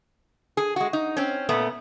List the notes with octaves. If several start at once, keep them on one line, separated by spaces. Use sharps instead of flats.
G#4
G#3 F#4
D#4
C4 C#4
A#2 A3 B3